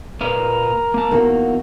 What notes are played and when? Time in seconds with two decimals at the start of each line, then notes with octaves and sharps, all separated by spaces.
0.21 A#2 A#4 B4 F5
0.94 A#3 A5
1.11 E2 A#3 D#4 F#4